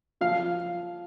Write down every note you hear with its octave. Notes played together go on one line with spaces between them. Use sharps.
F3 F5